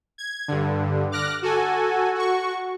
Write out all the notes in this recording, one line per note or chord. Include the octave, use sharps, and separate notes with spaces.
G#6
G2 D3
D6 F6 F#6 A#6
F#4 A4 G#5
F#4 C#6